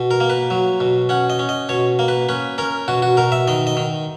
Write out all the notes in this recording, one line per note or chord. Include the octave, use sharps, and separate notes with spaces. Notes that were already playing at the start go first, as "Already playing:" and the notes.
Already playing: B2
A#4
A#3
B4
F#3
B2
C#4 F#5
D#5
C#4
D#5
B2 C#5
A#3
B4
C#4 B4
C#4 A#4
B2 F#4
F#4
B2 A#4
E5
D#3 D#5
D#5
D#3